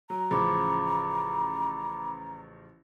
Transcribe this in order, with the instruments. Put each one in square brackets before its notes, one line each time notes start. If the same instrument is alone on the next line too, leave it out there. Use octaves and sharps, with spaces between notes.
[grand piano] F#3 [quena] A#5
[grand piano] A1 C#3 F3 [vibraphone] B5 D6